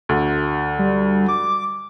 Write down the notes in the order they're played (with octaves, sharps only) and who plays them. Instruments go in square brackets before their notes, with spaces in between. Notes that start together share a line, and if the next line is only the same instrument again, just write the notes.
[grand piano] D2
[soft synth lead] G3
D6